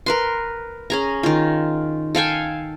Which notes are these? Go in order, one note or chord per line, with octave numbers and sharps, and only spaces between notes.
A#4 B4 C6
C#4 G#4 A#5
D#3 F4
A4 F5 G5 G#5